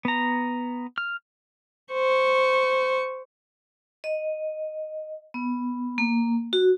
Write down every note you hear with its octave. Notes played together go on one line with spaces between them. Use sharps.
B3 A#5
F6
C5 C#6
D#5
B3
A#3
F#4